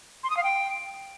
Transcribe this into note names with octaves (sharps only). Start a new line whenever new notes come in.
C6
D#6
F5
G5